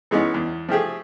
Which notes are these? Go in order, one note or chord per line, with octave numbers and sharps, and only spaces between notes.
E3 G#3 B3 C#4 D#4
E2
F3 A3 G4 G#4